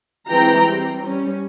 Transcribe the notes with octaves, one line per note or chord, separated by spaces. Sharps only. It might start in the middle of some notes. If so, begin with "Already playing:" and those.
E3 G#3 C4 G5 A#5
G3 C4
G3 C#4